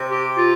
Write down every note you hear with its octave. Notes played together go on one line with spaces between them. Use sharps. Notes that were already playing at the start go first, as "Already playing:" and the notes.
Already playing: C3
G4
F4